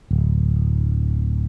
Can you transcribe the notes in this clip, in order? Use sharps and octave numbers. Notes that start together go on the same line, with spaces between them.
D1